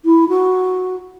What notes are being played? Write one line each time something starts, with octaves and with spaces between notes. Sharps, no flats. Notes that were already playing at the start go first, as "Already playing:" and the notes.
E4
F#4